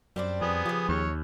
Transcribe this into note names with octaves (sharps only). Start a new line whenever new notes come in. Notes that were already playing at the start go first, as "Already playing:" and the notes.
F#2 G3 C4 D4
F2 B3 G#4
C#3 F3 G4
D#2 C#5